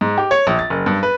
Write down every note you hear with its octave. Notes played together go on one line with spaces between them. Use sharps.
G#2
G4
C#5
A#1
A6
F#1
G2
B4